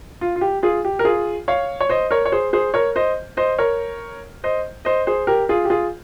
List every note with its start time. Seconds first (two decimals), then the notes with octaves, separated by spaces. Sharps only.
0.21 F4
0.36 F4
0.41 G4
0.63 F4 G#4
0.85 G4
0.99 A#4
1.05 F4 G#4
1.48 C#5 F5
1.80 C#5
1.89 C5 D#5
2.11 A#4 C#5
2.26 C#5
2.32 G#4 C5
2.53 G#4 C5
2.74 A#4 C#5
2.96 C5 D#5
3.37 C5 D#5
3.58 A#4 C#5
4.44 C5 D#5
4.85 C5 D#5
5.07 G#4 C5
5.27 G4 A#4
5.49 F4 G#4
5.65 G4
5.70 F4 G#4